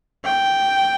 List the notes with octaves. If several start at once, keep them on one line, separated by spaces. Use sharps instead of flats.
G5